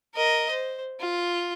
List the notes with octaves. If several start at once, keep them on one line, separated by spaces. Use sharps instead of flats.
A#4 D#5
C5
F4